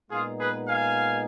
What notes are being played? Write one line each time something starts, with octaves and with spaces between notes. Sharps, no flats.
A#2 G#3 B3 D#4 F4 G#4
G#4 B4
F5 G#5